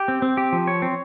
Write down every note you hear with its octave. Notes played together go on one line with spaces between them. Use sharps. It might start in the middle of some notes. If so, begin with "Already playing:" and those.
Already playing: G4
C4
C4
G4
F3
C#5
C4